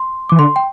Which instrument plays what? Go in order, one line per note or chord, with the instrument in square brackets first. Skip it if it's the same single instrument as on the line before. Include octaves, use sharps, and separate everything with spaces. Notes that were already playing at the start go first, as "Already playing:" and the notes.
Already playing: [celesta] C6
[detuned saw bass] E3 [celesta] D6
[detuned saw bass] D3 [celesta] C6
[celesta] G5